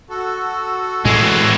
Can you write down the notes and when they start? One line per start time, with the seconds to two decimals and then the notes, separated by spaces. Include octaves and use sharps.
0.10 F#4 A4
1.05 A2 E3 G#3